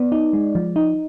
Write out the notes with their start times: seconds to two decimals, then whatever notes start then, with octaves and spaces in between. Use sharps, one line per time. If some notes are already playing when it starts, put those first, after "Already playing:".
Already playing: B3 D5
0.12 D#4
0.33 G#3
0.55 F3
0.76 D#4